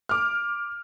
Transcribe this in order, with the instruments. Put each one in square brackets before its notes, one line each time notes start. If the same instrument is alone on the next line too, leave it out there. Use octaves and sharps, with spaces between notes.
[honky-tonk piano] D6 F6